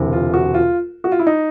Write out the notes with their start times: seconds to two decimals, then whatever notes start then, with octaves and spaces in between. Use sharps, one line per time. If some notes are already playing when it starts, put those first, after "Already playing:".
Already playing: E1 D2 C3 E3
0.13 F4
0.34 F#4
0.54 F4
1.04 F#4
1.12 F4
1.19 E4
1.27 D#4